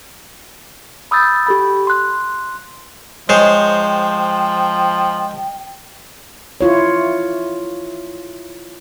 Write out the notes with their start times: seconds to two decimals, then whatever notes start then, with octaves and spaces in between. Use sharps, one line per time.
1.11 B5 D#6 E6 G6 A6
1.47 G4 A4 B5
1.87 C6 F#6
3.29 F3 G#3 C5 C#5 G5
6.61 E4 F4 C#5